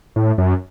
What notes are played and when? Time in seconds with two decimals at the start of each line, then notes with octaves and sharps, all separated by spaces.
0.16 A2
0.38 F#2